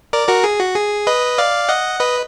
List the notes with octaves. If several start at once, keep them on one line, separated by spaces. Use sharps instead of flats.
A#4 D5
F#4 A#4
G#4
F#4
G#4
B4 D#5
D5 F5
D#5 F#5
B4 D#5